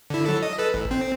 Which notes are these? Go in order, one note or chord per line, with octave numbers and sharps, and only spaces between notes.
D3 E4
F#3 A4
D#5
A4 B4
A1
C4